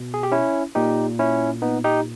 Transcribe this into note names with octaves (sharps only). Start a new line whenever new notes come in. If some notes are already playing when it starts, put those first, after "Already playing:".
Already playing: B2
G#4
G4
C#4 E4
A#2 D#4 G4
C#4 E4
B3 D#4
D#4 G4